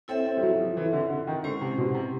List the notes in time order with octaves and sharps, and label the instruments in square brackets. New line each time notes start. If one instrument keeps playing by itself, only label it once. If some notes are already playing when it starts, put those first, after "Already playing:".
[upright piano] C4 [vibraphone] E4 A4 C#5 E5
[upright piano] C4
G3
F#3
F3
E3
D3
D3
D#3
[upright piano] D3 [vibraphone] G#3 C#4 E4 G4 C5
[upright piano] C3
B2
C3